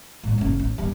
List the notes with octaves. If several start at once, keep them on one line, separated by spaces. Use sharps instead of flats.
A2 G#3
F#1 C#3
A1
G2 G3